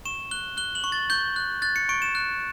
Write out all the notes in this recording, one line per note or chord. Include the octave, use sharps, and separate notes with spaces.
C#6 E7
F#6 G7
F#6 G7
F#7
C#6
A6
C#6 G6
F#6
F#6 A6
C#7
C#6 D7
E7
F#6